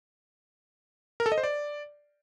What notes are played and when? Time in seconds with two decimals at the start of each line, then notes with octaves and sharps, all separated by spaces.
1.20 A#4
1.26 A4
1.32 D#5
1.38 C5
1.43 D5